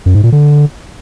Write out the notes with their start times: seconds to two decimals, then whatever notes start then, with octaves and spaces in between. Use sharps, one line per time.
0.06 F#2
0.15 G#2
0.23 A#2
0.32 D3